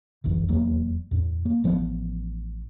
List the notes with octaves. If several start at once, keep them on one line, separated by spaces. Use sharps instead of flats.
G1 C2 F#2 E3
D#1 E2 F#3 A#3
E2 A2
A#3
A1 F3 G3 B3